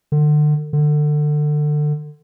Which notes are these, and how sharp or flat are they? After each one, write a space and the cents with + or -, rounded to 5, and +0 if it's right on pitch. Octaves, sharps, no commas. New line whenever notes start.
D3 +35
D3 +25